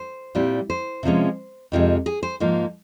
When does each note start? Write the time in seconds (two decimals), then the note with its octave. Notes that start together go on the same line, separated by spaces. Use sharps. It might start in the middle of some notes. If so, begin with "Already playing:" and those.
Already playing: C5
0.35 A#2 G3 C4 E4
0.70 C5
1.03 C3 F3 G#3 C#4
1.72 F2 C3 F3 G#3
2.06 G#4
2.23 C5
2.40 G#2 F3 A#3